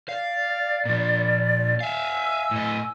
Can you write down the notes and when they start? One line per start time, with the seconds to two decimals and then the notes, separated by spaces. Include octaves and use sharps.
0.09 D5 F5
0.85 A#2 F3
1.81 E5 F5 G#5 E6
2.51 A2 D#5